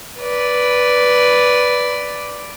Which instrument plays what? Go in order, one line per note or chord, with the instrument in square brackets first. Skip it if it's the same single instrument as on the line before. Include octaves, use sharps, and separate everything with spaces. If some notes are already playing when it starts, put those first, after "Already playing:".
[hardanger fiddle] B4 D5